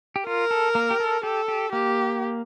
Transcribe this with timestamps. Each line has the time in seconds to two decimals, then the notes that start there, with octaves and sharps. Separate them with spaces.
0.16 G4
0.27 F4 A#4
0.51 A4
0.75 A#3
0.91 G4
1.00 A4
1.23 G4 A4
1.48 G4
1.72 A#3 G4